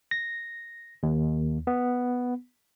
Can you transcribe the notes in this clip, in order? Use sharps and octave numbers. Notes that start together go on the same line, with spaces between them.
A#6
D#2
B3